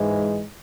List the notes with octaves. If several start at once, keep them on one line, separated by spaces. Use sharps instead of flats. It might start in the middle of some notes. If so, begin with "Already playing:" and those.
Already playing: G#2 E3 G#3